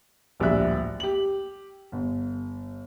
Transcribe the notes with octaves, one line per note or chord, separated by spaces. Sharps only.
D1 A#1 G3 G4 E5 F#6
G4 F#7
G1